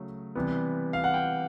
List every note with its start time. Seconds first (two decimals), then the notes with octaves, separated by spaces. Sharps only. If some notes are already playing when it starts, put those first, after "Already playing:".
Already playing: C#3 F#3 A3
0.35 C3 E3 G3 B3
0.93 F5
1.04 F#5
1.14 G5